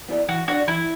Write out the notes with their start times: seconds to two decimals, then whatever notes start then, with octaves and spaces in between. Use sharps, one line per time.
0.09 B3 E4 D5
0.28 E3 F#4
0.48 D4 F#4 B4 D5
0.67 E3 E4